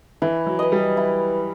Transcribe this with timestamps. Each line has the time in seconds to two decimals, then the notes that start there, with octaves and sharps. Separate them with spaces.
0.22 E3 E4
0.46 F#3
0.59 B4 D#5
0.72 G3
0.97 E4